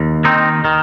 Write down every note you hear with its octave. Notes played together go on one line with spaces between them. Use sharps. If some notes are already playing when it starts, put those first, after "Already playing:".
Already playing: D#2
D#3 C4 D#4
D#3